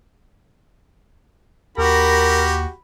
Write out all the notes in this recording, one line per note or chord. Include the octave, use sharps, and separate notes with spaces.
D#2 F#4 G4 A#4 B5 A#6